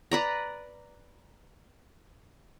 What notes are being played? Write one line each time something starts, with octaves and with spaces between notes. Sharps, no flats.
B4 D5 A#5